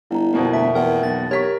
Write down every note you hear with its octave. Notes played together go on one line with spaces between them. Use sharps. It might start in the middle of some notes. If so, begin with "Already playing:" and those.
G1 E4 A#5
F2 B2 A#3
D2 E5
E2 A#4 E5 F#5 G5
B1 A6
G4 A#4 C#5 C#6 B6